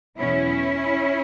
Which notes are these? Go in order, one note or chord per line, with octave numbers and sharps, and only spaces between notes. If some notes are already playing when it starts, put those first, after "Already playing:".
E2 B2 F#3 B3 C#4 E4